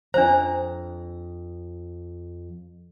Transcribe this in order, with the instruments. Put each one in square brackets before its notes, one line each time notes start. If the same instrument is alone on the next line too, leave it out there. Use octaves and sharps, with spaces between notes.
[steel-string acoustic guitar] F2 A#5 [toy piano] D4 C5